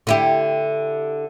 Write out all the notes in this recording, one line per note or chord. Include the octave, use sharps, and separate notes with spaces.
D3 E4 G4